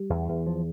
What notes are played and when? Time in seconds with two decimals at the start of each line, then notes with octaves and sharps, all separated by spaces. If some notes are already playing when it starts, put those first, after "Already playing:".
Already playing: G3
0.10 E2
0.28 E2
0.46 F3